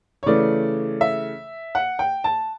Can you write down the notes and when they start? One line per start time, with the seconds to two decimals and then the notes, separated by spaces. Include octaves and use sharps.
0.23 C#5
0.26 C#3 E3 A3 D5
1.01 E5
1.75 F#5
1.99 G5
2.24 A5